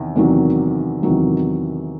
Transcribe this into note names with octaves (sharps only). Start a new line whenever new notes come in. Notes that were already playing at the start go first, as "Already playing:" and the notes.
Already playing: E2 C3 D#3
E2 C3 D#3 F#3
E2 C3 D#3 F#3